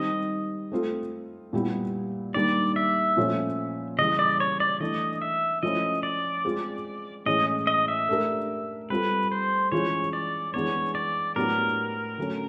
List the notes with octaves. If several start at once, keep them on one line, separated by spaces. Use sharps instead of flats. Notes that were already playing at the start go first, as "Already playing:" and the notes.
Already playing: D#3 G3 C4 D#5
A3 C4 F4 A4
A#2 G3 B3 E4 G4
D#3 G3 A#3 D4 D5
E5
A#2 F3 A3 C#4 F4
C#3 E3 G3 D#5
D5
C#5
D5
E3 A3 D4 D#5
E5
F3 A3 C#4 E4 D#5
D5
G#3 C4 F4
A2 E3 G#3 C#4 D#5
D#5
E5
A3 D4 G4 A#4
G3 C4 F4 A4 B4
C5
E3 G#3 C#4 F4 C#5
D5
E3 G#3 B3 D4 C#5
D5
A2 F#3 B3 D4 G4 A#4
D3 F#3 A3 C#4